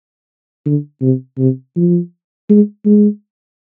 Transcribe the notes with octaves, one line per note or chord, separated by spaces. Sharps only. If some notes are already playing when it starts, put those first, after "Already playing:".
D3
C3
C3
F3
G#3
G#3